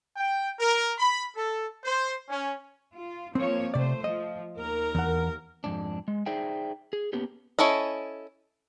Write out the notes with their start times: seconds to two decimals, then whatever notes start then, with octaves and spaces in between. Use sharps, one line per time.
0.16 G5
0.58 A#4
0.98 B5
1.36 A4
1.83 C5
2.29 C#4
2.94 F4
3.35 F3 A#3 C4 C#5
3.74 C3 A3 C5 D5
4.04 F3 D#5
4.55 D#2 A#4
4.95 E2 F#5
5.64 F2 G#2 D4
6.08 G#3
6.26 D#4 G#4 C5 D5 E5 G5
6.93 G#4
7.13 A#3 B3 C#4 G4
7.59 C#4 E4 A4 D#5